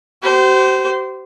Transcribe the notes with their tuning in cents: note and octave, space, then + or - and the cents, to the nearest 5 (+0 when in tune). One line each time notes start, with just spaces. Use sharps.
G4 -45 C5 -20